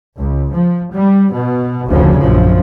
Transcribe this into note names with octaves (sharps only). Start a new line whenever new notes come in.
C#2
F3
G3
B2
F1 D2 C#3 F3
A#1 F#2 F3